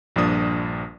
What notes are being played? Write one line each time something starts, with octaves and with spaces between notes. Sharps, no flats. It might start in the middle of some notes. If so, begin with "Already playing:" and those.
A#1 G2 F3 A#3 D4 D#6